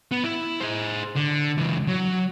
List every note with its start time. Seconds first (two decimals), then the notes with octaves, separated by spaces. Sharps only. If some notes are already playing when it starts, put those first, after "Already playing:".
0.11 B3
0.24 E4
0.60 G#4 C5
1.15 D3
1.58 C#2 E3
1.88 F#3